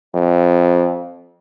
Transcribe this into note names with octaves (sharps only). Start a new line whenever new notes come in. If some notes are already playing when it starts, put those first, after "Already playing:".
F2